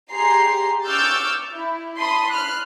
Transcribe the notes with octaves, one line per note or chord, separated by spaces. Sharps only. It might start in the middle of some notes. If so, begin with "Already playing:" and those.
G4 G#4 A#5 C6 C7
C#6 D6 E6 F6 G6 A6
E4
A5 B5 C6 D#6
F6 F#6